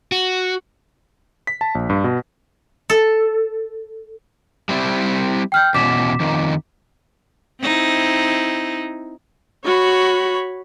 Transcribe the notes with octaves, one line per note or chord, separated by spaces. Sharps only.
F#4
B6
A5
A#1
G2
B2
A4
G3 C4 E4
G5 F6 G6
E2 B2 C#4 D6 B6 E7
F2 D#3
C4 D#4 E4
F#4 C#5 B5